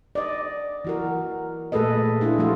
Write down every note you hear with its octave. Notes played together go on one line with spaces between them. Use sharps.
D5 D#5
E3 F#4 A#4
A#2 A3 G#4 A4 B4 D#5
D4 E4 F4 G#4
F3 G3 A3 F4 F#4